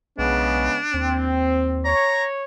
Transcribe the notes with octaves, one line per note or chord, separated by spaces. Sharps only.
B1 C#3 G#3 B3 D4
D#2 C4
C#5 A#5